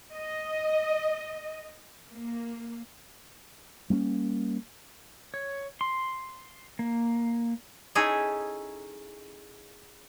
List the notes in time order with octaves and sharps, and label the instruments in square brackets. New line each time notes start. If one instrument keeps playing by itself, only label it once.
[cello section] D#5
A#3
[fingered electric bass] G3 A#3 B3 C#4
[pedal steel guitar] C#5
C6
A#3
[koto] C#4 D#4 E4 G#4 A4